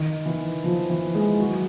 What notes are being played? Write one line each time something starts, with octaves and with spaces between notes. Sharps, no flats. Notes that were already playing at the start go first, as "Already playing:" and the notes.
Already playing: D#3
E3
F3
E3
G#3
F#3